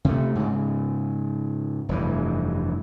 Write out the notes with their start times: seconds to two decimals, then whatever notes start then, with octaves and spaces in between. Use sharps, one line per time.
0.05 C3 A3
0.35 G#2 C#3
1.89 F1 G2 E3